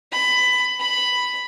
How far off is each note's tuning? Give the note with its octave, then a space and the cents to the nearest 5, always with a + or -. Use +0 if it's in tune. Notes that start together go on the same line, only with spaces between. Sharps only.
B5 +15
B5 +5